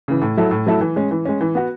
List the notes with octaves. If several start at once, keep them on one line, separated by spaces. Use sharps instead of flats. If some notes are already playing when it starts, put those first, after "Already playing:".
C#3 E3
A2
F#3 A3 E4 A4
A2
F#3 A3 E4 A4
E3
G#3 C#4
E3
G#3 C#4
E3
B3 F#4